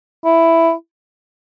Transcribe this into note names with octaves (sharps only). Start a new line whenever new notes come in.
E4